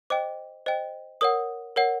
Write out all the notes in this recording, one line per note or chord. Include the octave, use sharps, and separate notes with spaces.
C5 D#5 G5 D6
C5 D#5 G5
A#4 C#5 F#5 D#6
A#4 C#5 F#5